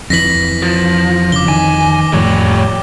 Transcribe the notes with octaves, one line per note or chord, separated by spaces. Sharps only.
F2 E3 A#6 B6 F#7
F3
C#3 D6 G7
D#3 G#5
F2 A2 G3 C#5